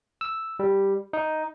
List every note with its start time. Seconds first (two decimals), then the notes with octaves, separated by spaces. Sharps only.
0.21 E6
0.59 G3
1.13 D#4